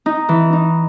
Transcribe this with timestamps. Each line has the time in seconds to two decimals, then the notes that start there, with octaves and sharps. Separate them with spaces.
0.06 D#4
0.29 E3
0.53 D#4